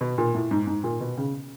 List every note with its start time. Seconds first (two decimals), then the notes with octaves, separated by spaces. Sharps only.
0.01 B2
0.18 A#2
0.35 A2
0.51 G#2
0.67 G#2
0.84 A#2
1.00 B2
1.17 C#3